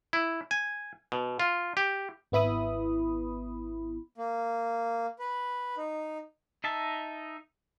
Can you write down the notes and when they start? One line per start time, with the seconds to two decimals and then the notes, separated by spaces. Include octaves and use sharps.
0.13 E4
0.51 G#5
1.12 B2
1.40 F4
1.77 G4
2.32 G#1 B3 E4 B5 D#6
4.18 A#3
5.19 B4
5.77 D#4
6.64 D#4 D#5 E5 A5